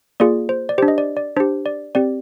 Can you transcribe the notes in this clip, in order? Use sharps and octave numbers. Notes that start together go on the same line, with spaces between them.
A#3 F4 G#4 D5
C5
D5
D4 G4 C5
D#5
D5
D5
D4 G4 C5
D5
C4 G4 D5